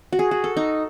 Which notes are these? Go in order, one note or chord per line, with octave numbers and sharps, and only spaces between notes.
F#4
G#4
F#4
A4
D#4